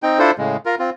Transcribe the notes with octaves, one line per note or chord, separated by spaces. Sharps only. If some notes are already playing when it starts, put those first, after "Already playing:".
C4 D#4 G5
D4 E4 F4 A4 C5
A2 C#3 G#3
F4 A#4
C4 F4